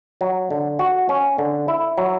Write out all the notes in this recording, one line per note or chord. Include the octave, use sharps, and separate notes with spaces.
F#3
D3
F#4
C#4
D3
E4
F#3